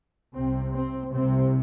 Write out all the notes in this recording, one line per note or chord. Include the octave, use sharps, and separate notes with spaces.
C2 C3 C4
C4
C2 C3 C4